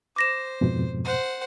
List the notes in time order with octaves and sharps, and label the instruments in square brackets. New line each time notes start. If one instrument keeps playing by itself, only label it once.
[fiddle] C5 [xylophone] D6 A#6 E7
[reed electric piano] F2 G#2 B2
[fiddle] C5 F#5